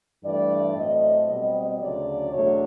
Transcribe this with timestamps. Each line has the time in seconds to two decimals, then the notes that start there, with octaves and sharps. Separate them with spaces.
0.24 G2 E3 A3 D5
0.75 A2 F#3 A3 C4 D#5
1.28 B2 G3 C4 D#5
1.80 D2 C#3 F#3 D5
2.32 E2 B2 F#3 A3 D4 C#5